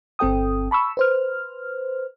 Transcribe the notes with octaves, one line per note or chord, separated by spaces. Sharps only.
G1 C4 A4 G5 D#6
A5 B5 C#6 E6
B4 C5 F6